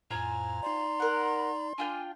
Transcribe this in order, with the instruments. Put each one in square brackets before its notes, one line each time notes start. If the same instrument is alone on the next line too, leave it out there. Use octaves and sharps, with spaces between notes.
[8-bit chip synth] F2 A2 [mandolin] F4 C5 G#5 [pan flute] A#5
[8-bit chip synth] D#4 D5 [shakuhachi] C6
[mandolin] A#4 F#5
[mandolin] D4 F4 G5 [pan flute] G#5